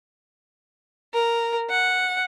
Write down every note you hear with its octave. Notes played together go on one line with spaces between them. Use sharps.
A#4
F#5